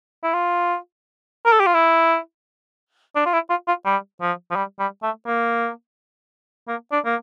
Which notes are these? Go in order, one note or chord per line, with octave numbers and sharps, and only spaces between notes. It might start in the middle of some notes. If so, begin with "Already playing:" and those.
E4
F4
A#4
A4
G4
F4
E4
D4
F4
E4
F4
F4
G3
F3
F3
G3
G3
A3
A#3
A#3
D4
A#3